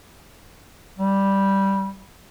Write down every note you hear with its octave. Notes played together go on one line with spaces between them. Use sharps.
G3